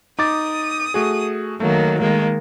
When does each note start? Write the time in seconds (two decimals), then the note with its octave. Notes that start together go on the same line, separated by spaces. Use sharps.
0.19 D#4 D6 D#6 A6
0.94 A3 F#4 G#4
1.60 D#3 F#3 A3 A#3
2.00 D#3 G#3 A#3